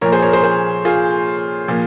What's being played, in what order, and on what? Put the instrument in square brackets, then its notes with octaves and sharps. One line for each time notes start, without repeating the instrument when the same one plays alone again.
[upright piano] A#2 F3 A#4 C#5
G#4 C5
A#4 C#5
G#4 C5
G#4 C5
F4 G#4
A#2 F3